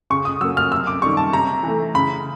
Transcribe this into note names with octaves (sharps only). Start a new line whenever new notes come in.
C#3 C#6
D#6
F#3 A#3 E6
F6
C3 E6
D6
D#3 G3 C#6
A5
C3 A#5
E3 A3
C#3 B5